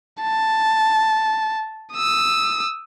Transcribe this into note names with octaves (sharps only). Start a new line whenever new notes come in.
A5
D#6 E6